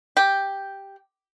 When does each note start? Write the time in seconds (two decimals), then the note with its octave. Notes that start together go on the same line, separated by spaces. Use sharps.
0.17 G4